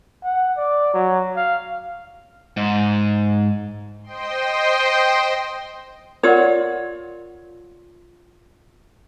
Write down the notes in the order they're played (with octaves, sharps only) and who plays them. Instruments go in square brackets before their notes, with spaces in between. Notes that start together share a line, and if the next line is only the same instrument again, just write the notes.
[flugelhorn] F#5
D5
F#3
F5
[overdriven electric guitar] G#2
[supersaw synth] C5 D#5 G5 C6
[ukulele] F4 C#5 [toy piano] A#4 D5 F#5